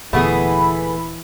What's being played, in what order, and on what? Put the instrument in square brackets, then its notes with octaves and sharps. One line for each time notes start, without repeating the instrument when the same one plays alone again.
[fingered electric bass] D#1 A#2 D3 [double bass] E3 [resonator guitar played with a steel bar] A3 B3 G#4 [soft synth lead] B5